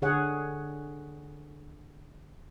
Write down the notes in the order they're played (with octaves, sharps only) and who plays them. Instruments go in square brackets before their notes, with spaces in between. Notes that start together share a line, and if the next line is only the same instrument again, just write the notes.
[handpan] D3 G#4 C#5 F#5